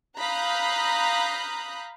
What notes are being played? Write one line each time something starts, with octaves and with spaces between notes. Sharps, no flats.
F5 A#5 B5 D#6 F#6 G6